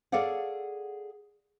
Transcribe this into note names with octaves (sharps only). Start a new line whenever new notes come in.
G#4 A4 C#5 D5 F5 F#5